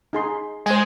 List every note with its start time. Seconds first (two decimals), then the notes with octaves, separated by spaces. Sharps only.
0.13 D#4 G#4 C6
0.66 G#3 C5 G#5